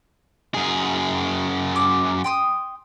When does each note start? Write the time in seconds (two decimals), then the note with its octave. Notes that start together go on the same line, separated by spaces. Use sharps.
0.54 F#2 G#4
1.76 D6
2.24 G5 C6 D#6